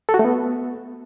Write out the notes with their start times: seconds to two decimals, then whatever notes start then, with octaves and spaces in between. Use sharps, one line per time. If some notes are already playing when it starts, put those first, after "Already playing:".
0.09 A4
0.14 F#4
0.19 A3
0.25 B3